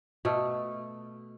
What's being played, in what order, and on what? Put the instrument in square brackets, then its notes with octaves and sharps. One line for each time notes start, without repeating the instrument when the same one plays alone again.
[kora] B2 A3